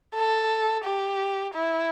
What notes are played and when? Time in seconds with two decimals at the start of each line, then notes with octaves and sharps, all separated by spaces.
0.15 A4
0.84 G4
1.55 E4